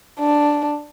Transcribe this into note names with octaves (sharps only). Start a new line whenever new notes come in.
D4